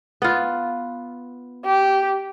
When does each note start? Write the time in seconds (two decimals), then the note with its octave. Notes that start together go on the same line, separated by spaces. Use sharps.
0.22 B3 F4
1.66 G4